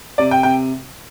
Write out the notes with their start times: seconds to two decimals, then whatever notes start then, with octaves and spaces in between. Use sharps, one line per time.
0.18 C3 D5
0.31 G5
0.43 C3 G5